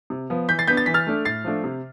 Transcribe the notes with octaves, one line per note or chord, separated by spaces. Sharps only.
C3
F3 B3
E3 G6 B6
A6 C7
B3 D4 G6 B6
A6
E3 B6
F6 A6
A3 D4
A2 A6 C7
F3 A3 D4
C3